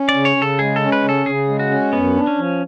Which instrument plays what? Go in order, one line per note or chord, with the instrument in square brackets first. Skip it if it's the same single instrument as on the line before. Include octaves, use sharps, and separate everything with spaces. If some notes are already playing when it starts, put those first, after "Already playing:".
Already playing: [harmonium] C#4
[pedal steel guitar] D5
[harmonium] C#3
[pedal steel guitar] C#5
[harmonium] C#3
[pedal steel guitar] A4
[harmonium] G#3 [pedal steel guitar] G#4
[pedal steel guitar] A4
[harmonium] C#4
[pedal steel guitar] B4
[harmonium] C#3
[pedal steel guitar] A4
[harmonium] C#3 [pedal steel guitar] G#4
[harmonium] G#3
[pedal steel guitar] F#4
[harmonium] C#4
[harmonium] F#2 [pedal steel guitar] B3
[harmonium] D4
[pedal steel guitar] C#4
[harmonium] F3